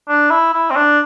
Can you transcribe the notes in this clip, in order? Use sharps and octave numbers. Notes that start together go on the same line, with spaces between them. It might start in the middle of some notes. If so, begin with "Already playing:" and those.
D4
E4
E4
C4
D4